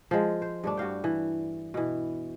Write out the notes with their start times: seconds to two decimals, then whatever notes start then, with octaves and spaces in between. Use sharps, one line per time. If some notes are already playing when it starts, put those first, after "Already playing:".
0.11 F3 G#3
0.42 C5
0.64 G2 A3 D4
0.77 G2 F#4 F5 G5
1.04 E3
1.74 B2 E3